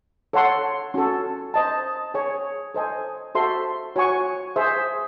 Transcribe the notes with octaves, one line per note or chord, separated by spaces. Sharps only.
A4 C#5 F#5 C6
C#4 F#4 A4
C5 D#5 A5
G#4 C#5 G#5
A4 C5 D#5 G#5
F#4 A4 C5 E5 C6
F#4 C#5 G#5 C#6
G#4 C5 E5